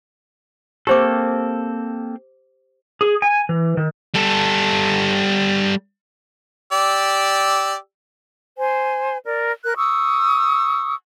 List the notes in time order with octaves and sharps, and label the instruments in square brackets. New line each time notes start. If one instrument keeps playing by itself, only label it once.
[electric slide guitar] A#3 C4 A4 [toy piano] G4 C5 D6
[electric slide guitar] G#4
G#5
E3
D#3
[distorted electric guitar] G3 A4
[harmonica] G4 D5 E6
[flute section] C5 G#5
A#4 D5
A#4 F#6
C#6 D#6 E6